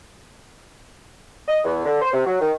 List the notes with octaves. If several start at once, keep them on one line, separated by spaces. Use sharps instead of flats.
D#5
E2
D3
C5
C3
F#3
D#3